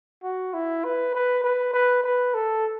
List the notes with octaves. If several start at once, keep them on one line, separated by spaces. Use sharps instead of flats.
F#4
E4
B4
B4
B4
B4
B4
A4